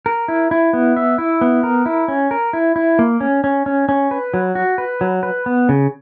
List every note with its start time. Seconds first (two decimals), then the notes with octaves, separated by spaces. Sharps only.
0.06 A#4
0.28 E4
0.51 E4
0.73 B3
0.97 E5
1.18 E4
1.41 B3
1.63 A#4
1.86 E4
2.08 C#4
2.31 A#4
2.53 E4
2.76 E4
2.99 A#3
3.21 C#4
3.44 C#4
3.66 C#4
3.89 C#4
4.11 B4
4.34 F#3
4.55 F#4
4.78 B4
5.01 F#3
5.23 B4
5.46 B3
5.69 C#3